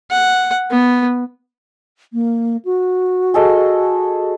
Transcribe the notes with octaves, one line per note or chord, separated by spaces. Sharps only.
F#5
B3
A#3
F#4
G#4 A4 D#5